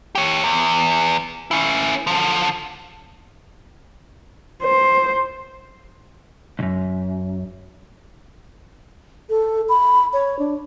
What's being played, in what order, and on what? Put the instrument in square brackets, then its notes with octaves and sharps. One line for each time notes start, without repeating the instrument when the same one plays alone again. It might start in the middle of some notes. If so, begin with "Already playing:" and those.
[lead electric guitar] G4 C#5
E2
C#4 E4
D3 F3
[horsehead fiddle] C5
[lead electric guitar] B1 F#2
[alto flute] A4
B5
C#5
D4